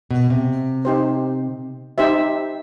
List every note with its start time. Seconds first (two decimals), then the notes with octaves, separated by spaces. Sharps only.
0.11 B2
0.30 C3
0.85 D#4 G4 C5
1.98 D#4 G4 C5 E5